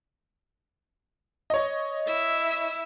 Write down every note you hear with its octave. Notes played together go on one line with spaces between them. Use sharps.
C#5 D#5
E4 E5